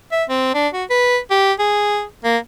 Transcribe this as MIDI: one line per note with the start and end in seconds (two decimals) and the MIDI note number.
0.12 0.24 76
0.29 0.54 60
0.55 0.68 62
0.74 0.84 66
0.90 1.18 71
1.31 1.53 67
1.59 2.04 68
2.24 2.38 58